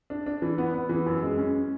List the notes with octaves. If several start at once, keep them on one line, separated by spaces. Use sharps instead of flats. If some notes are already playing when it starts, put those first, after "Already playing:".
D4
D4
E3
B3
B3
E3
F#2
G#3
C#4